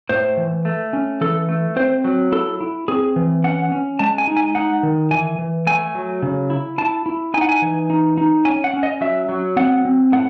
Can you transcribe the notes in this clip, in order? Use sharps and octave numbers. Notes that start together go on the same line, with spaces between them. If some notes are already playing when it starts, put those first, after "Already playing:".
A2 C5
E3
A3
C#4
E3 A4
A3
C4 C5
F#3
E4 A4
E4
C4 G#4
E3
C#4 F#5
C#4
G#3 A5
G#5
D#4
G#5
D#4 F#5
D#3
E3 G#5
E3
A3 G#5
F#3
C#3
E4
E4 A5
E4
D#4 G#5
F#5
G#5
E3
D#4
D#4
C#4 G#5
F#5
C#4
D#5
F#3 E5
F#3
C4 F#5
C4
A2 F#5